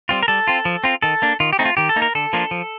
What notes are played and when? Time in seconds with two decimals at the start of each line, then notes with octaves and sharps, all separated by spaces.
0.09 G3 C4 F4
0.23 A#4
0.28 G3 A4
0.47 C4 F4
0.65 F3
0.84 C4 F4
1.02 D#3 A4
1.22 A#3 D4
1.40 D#3 F4
1.53 G4
1.59 A3 C4 D#4
1.65 F4
1.77 D#3 G4
1.89 A4
1.96 A#3 D#4
2.02 A#4
2.15 D3 A4
2.33 F3 A#3 D4 F4
2.51 F3